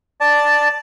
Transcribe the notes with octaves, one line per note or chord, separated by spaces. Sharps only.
D5 A5